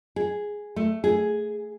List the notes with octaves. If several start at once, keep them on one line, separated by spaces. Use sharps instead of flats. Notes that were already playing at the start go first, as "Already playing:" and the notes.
G#4
A3
G#4